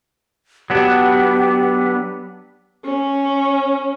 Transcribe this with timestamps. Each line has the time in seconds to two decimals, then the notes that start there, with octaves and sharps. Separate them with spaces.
0.70 F#3 B3 D4 G4
2.84 C#4